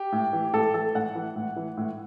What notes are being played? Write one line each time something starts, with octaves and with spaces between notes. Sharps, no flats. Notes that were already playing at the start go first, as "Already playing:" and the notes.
Already playing: G4
A2
E3
A2 A4
E3 A4
A2 F#5
E3
A2
E3
A2